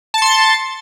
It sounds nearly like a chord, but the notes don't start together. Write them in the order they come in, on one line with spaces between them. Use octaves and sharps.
A5 C#7 C6 A6